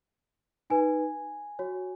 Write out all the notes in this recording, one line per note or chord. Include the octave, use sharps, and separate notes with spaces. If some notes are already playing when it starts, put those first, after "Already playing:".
D#4 B4 G#5
F#4 C#5